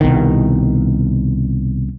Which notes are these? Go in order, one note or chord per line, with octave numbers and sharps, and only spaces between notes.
C2 B2 D#3